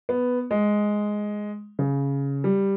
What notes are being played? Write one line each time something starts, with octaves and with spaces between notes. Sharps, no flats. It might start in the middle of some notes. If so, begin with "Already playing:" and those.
B3
G#3
C#3
G3